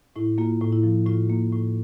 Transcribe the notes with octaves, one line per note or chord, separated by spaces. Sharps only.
A2 E4
A#3 F4
A2
E4
F3
A2 F4
A#3
A2